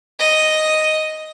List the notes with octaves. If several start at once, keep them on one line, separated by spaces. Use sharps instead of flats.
D#5